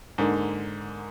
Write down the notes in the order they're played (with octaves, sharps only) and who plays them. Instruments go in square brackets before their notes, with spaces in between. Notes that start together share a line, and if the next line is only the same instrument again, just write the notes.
[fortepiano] G#2 D3 A#3